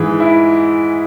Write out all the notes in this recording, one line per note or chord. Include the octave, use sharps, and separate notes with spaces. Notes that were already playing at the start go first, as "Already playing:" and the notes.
Already playing: G#2 E3 G#4
E4